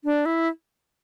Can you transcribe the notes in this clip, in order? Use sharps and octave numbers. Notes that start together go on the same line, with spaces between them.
D4
E4